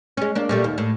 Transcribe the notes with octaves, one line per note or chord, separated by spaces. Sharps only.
G#3 C#4
A#3 D4
A#2 G3 A3
D#2
A2